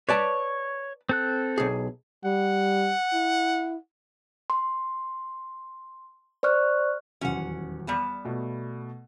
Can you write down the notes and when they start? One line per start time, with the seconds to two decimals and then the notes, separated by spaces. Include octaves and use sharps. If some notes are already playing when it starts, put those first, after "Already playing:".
0.09 B4 C#5 D5 A5
1.09 C4 A4 F#6
1.58 B1 G#4
2.25 G3 F#5
3.13 E4
4.50 C6
6.43 C5 D5 C#6 F6 F#6
7.21 D#1 E2 F#3 C#4 F#5
7.87 G3 B3 A5
8.25 B2 A3